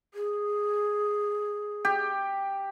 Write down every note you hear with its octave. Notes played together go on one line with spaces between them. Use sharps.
G#4
G4